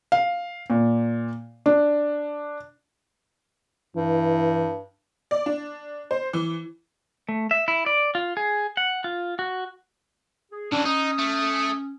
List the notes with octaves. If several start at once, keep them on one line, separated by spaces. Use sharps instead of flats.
F5
A#2
D4
G2 E3
D5
D4
C5
E3
A3
E5
E4
D5
F4
G#4
F#5
F4
F#4
G#4
A2 E3 C#4 D4
D#4 D#6
A3